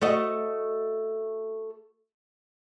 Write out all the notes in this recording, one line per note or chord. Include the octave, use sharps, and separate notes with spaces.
A3 F#4 D#5